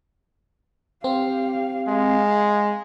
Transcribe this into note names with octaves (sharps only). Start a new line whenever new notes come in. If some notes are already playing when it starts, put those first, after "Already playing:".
C4 G4 F5
G#3 F5